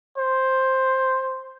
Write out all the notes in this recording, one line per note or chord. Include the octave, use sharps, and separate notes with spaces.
C5